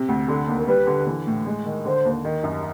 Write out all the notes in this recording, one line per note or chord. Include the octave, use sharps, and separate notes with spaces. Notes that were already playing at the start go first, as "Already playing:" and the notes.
Already playing: C3
D2
D3 A4
D#2
A#4
G3 B4
D3
E3
A2
G#3
D#3
D3 C5
D#2
D#3
F#2